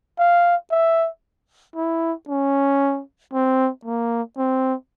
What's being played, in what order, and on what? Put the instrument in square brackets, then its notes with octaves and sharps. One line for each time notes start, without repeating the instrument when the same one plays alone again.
[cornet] F5
E5
E4
C#4
C4
A#3
C4